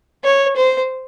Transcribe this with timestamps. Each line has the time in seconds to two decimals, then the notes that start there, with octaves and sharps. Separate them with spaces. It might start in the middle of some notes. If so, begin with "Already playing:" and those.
0.24 C#5
0.56 C5